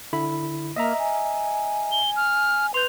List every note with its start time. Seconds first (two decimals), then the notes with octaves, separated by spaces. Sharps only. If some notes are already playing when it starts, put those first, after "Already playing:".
0.13 D3 E4 B5
0.76 A#3 D#5 E5 A#5
0.99 G#5
1.92 G7
2.16 F6
2.74 B4 C6 G6 F7